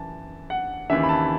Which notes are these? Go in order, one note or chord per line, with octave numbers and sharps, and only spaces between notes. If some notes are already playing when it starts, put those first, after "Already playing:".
Already playing: F#2 E3 A5
F#5
D#2 C#3 E3 E5
B5
A5